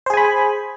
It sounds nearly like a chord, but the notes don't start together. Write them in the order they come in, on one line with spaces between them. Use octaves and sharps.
C5 G#4 G#5 B5